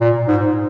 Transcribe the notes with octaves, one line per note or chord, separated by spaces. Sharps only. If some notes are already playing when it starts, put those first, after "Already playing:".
A#2
G#2